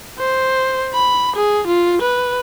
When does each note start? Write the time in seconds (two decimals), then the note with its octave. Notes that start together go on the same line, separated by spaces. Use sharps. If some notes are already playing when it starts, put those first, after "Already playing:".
0.19 C5
0.94 B5
1.36 G#4
1.67 F4
2.01 B4